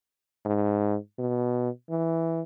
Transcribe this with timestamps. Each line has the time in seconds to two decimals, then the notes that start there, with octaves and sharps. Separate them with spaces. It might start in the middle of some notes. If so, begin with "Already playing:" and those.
0.45 G#2
1.19 B2
1.90 E3